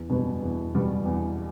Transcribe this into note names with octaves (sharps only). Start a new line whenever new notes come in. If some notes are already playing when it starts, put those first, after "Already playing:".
Already playing: E2
B2 G3 B3
E2
B2 G3 B3
E2